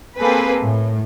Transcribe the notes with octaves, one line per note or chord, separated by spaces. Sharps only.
A#3 C4 G#4 A4 B4
A2